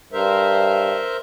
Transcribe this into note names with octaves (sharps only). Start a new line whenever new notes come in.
G2 A#4 C5 E5